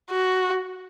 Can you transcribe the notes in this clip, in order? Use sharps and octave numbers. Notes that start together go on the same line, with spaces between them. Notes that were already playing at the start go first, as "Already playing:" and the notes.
F#4